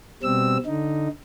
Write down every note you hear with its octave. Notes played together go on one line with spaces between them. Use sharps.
B2 G3 C4 E6
D3 D#4